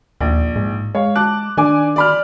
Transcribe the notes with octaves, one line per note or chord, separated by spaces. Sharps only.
A#1 D#2
G#2
G#3 C#5 F5
A5 D6 F#6
D#3 D4 G#5 D6
D5 B5 F6